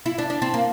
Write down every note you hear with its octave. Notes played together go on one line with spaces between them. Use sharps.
E4
D4
D4
C4
A#3